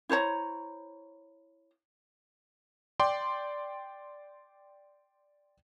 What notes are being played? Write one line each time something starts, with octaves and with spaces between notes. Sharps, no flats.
E4 C5 C#5 A#5
D5 G5 C6 D6